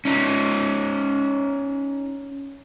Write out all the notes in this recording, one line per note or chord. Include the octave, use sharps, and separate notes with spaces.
C#4 D#4